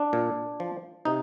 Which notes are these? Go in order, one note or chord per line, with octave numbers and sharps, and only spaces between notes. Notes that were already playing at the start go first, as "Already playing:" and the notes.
Already playing: D4
A#2
F3
C3 D#4